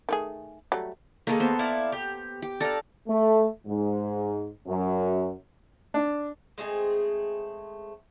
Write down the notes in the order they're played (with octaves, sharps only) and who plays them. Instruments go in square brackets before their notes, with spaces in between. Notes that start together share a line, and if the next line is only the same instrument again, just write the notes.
[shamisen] D#3 A3 G#4
F#3 G3 A3
[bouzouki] D3 D#3 G#3 [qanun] A#3 A4
[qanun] B3 C5
[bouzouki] E4 D5 F5
G4
[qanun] G4
[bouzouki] D4 F5 [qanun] A4 A#5
[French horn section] A3
G#2
F#2
[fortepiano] D4
[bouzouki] G#3 A3 C4 G#4